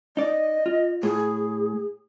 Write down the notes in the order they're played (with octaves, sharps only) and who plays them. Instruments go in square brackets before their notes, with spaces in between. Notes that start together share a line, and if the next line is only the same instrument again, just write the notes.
[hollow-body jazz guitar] D#4 D5 [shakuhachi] D#5
[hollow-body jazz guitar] F4
[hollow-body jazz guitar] A2 [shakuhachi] G#4